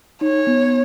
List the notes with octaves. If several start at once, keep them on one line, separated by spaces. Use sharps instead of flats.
D#4 C#5
B3